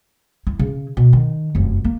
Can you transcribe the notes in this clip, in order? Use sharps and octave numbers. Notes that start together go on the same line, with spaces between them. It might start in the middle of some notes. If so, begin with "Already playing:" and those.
E4
C#3
B2
D#3
F1 F#2
A#3